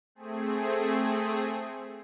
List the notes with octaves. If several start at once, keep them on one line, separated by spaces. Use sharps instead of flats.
A3 C4 G#4